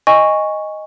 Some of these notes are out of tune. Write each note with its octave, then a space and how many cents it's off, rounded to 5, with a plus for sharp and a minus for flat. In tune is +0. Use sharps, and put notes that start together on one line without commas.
D#5 +0 G#5 -20 C#6 +0